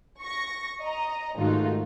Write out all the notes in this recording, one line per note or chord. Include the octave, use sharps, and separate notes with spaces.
C#6 A#6
D#5 A#5
G#2 D#3 A3 D#4 F4 F#4